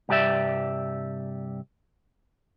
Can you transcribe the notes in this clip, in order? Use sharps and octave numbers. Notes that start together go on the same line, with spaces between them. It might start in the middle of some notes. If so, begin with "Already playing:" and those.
C2 G2 G4 D5 E5